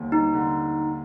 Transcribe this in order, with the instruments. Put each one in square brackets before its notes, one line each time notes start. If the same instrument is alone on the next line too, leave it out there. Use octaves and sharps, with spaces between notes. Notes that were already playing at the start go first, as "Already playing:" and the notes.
Already playing: [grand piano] D#2 D3 G3 C4
[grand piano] G3 [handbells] D#4
[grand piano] D3